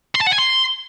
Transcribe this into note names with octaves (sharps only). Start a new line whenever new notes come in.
C6
A5
F#5
G#5
C6